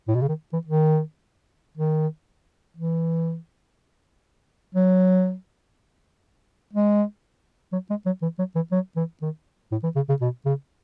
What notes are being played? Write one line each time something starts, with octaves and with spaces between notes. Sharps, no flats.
A2
B2
C#3
D#3
E3
D#3
D#3
E3
F#3
G#3
F#3
G#3
F#3
E3
F#3
E3
F#3
E3
D#3
A2
E3
C#3
C#3
B2
C#3